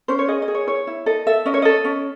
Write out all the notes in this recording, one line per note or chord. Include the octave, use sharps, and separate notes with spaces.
C#4 C5
C#5
G#4 D#5
D#5
G#4
C#5
E4 C#5
E4
A4 D#5
A4 E5
C#4 D#5
C#5
A4 D#5
C#4